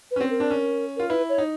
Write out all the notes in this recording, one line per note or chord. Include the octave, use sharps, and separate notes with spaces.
B4
C#4
C4
A#4
D4
C#4
F4 A#4
E4 B4
C#5
D#4